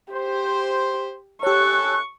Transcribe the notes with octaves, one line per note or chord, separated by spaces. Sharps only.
G4 C5
C#4 G4 A4 C#5 C#6 F#6